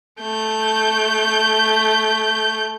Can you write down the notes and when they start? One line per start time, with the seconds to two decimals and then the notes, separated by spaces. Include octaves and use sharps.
0.21 A3 G6